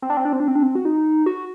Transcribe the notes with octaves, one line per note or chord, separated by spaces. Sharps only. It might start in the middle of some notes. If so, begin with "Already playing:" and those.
C4
D4
C4
D4
C4
D4
C4
D4
C4
F#4
D#4
F#4